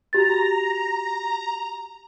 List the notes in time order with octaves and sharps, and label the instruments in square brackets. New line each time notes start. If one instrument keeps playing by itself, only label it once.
[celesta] F#4 G4 A6 [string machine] A#5